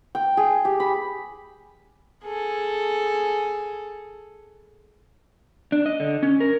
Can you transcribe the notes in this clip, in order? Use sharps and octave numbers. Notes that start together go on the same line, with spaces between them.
G5
G#4
G4
B5
G#4 A4
D4
D#5
D3
C#4
A#4